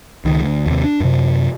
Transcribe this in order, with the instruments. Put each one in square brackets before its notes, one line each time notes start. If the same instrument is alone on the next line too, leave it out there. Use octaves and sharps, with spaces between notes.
[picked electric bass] C#2 D#3
D2
D#2 C3
D4
F#2 C3